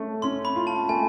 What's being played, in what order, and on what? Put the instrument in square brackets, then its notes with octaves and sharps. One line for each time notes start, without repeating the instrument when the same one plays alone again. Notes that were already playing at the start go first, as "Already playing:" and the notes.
Already playing: [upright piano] A3 C#4
[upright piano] C#4 [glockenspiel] C6
[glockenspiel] B5
[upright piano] F4
[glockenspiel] A5
[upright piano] A3 [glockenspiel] G#5